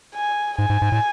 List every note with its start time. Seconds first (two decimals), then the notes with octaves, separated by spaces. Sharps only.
0.15 G#5
0.59 G#2 G#5
0.70 G#2
0.82 G#2
0.92 A2